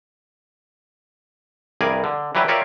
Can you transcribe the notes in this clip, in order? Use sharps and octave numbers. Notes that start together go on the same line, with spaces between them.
C2 G2 G#4 A#4 D5 G#5
D3
E3 F#3 G3 G4 B4 E5
F4 G4 A#4 C#5 D5 E5